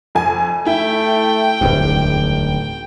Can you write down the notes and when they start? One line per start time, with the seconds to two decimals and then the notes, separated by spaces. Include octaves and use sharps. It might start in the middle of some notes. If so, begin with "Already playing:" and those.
0.15 F2 G#5
0.66 A3 E4 G5
1.61 D1 G#1 E2 G2